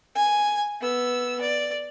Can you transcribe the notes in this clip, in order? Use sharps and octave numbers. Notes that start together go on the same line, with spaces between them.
G#5
B3 E6
D5